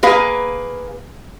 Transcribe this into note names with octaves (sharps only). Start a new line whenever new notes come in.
A#3 G#4 B4 F5